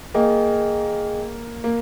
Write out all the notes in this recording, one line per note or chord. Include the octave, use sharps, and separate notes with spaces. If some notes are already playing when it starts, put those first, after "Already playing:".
A#3 G#4 D#5 G5
A#3